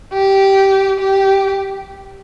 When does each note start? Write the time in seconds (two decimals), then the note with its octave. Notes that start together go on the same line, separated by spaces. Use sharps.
0.13 G4
0.99 G4